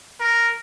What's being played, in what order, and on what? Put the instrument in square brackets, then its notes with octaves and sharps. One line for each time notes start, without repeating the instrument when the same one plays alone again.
[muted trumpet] A#4